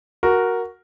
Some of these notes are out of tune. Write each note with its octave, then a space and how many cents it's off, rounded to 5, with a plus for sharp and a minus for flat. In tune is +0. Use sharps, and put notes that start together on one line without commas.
F#4 +0 A#4 +0